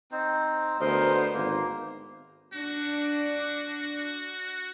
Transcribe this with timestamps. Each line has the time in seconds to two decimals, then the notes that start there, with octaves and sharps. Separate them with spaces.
0.11 C4 D#4 C5
0.80 D2 B3 A#4 C5 D#5 C6
1.34 G#1 A#3
2.53 D4 F#4